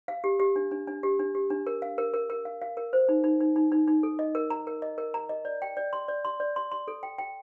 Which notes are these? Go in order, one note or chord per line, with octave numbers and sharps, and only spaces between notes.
F5
G4
G4
D4
D4
D4
G4
D4
G4
D4
A#4
F5
A#4
A#4
A#4
F5
F5
A#4
C5
D#4
D#4
D#4
D#4
D#4
D#4
A4
D#5
A#4
A#5
A#4
D#5
A#4
A#5
D#5
D5
G5
D5
C6
D5
C6
D5
C6
C6
A4
G5
G5